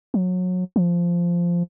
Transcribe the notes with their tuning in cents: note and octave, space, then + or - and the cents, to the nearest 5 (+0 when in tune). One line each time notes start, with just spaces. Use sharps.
F#3 -25
F3 -10